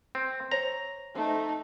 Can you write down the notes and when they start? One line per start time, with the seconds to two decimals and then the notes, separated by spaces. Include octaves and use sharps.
0.15 C4
0.51 C5 C#5 A#5
1.15 F3 A3 C4 D#4